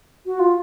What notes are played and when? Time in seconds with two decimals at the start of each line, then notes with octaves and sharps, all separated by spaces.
0.26 F#4
0.39 F4